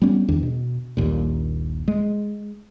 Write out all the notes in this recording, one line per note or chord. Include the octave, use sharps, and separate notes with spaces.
G3 B3 C#4
E2 D#3 D4
B2
D#1 A#1 D#2 A#2
G#3